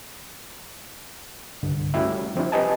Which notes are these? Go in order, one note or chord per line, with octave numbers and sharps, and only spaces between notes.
C2 G2 D3
G3 A3 C#4 E4 F#4 G4
F3 C4 D4 E4
G4 B4 D#5 G#5 A5